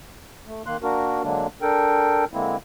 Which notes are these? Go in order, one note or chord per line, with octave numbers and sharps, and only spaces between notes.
A3
D#3 A#3 C6 F#6
A#3 D4 F#4 A#4
D3 F#3 G#3 A#3 D4
D4 A4 A#4 G5
D3 G#3 A#3 C4 E4